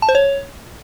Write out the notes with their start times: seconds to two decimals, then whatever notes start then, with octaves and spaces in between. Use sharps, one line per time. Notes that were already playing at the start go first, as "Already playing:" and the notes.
0.02 A5
0.09 C5
0.15 C#5